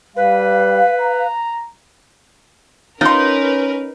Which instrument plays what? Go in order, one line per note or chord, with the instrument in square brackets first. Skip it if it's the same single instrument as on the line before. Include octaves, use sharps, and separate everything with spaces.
[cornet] G3 [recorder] B4 [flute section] F5
[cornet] A#5
[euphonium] C#4 [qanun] D#4 [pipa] F4 C6 [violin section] A#4 B4